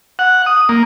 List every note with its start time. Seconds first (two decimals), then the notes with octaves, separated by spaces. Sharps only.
0.19 F#5
0.46 D#6
0.69 A#3